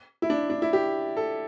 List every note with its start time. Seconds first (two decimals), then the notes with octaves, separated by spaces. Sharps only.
0.22 E4
0.30 D4
0.50 D4
0.62 E4
0.73 G4
1.17 A4